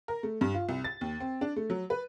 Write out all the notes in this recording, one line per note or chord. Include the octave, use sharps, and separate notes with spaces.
A#4
A3
G2
F4
C2
A6
D#2
C4
D4
A3
F#3
B4